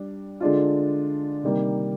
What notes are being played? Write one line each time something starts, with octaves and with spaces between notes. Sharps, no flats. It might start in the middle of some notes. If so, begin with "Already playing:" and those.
Already playing: G3 D4
D3 G#3 D4 F4
C3 D#3 G3 A#3